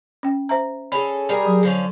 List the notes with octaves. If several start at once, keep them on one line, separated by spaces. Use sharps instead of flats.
C#4 G5
C5 E5 A#5
C#4 G#4 A4 B5
G3 G#4 A#4
F#3
D3 F3 C#4